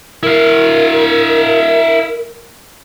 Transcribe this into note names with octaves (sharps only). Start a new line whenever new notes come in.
E4 A#4 F5